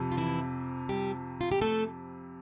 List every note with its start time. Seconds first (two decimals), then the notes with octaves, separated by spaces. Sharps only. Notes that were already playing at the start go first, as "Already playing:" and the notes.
Already playing: F2 C3
0.12 F4
0.17 E3 E4
0.89 G3 G4
1.41 F4
1.52 G4
1.61 A3 A4